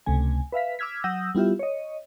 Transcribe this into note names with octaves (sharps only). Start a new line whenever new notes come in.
C#2 C3 A3 G#5
B4 E5 F5 B6
D6 E6 F6 G#6 B6
F#3 F#5 D#6 E6 G6 A#6
G3 B3 E4 F4 G4 E5
C#5 D#5